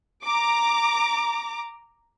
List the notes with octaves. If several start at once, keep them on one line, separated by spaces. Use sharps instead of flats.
A#5 D6